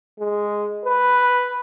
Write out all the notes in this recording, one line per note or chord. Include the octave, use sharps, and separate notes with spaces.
G#3
B4